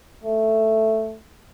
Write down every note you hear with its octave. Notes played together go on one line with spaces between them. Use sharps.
A3